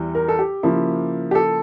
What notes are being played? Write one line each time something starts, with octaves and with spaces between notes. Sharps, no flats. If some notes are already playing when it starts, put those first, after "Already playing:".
Already playing: E2 E3 G3
A#4
A4
G4
C#3 F3 A#3 E4
G4
A4